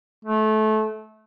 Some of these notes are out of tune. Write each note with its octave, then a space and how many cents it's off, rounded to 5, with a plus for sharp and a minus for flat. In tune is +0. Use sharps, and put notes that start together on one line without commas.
A3 -25